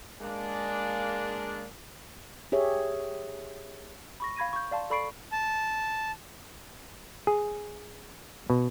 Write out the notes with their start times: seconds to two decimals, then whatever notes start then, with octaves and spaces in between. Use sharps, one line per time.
0.21 G#3 A#3 D4
2.52 G4 G#4 C#5 E5
4.20 B5 C#6 A#6
4.36 F5 B5 G#6 A#6 D#7
4.53 C#6 G6
4.71 D5 F5 A5 C6
4.90 A4 D5 B5 C#6 C7 D7
5.32 A5
7.27 G#4
8.50 B2